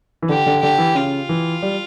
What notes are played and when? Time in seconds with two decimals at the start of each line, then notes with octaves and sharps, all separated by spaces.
0.22 E3
0.29 D3 G4
0.46 D3
0.63 D3 G4
0.78 E3
0.95 C#3 F4
1.29 E3
1.62 G3